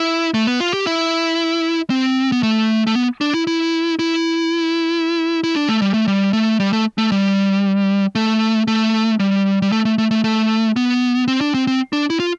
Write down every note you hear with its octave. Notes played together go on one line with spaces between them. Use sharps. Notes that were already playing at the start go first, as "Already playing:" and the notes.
Already playing: E4
A3
B3
F4
G4
E4
C4
B3
A3
A3
B3
D4
E4
E4
E4
E4
D4
A3
G3
A3
G3
A3
G3
A3
A3
G3
A3
A3
G3
G3
A3
A3
A3
A3
A3
B3
C4
D4
C4
C4
D4
E4
F4